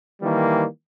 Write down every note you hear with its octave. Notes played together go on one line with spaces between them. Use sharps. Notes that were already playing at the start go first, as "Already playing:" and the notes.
D#3 E3 G3 A#3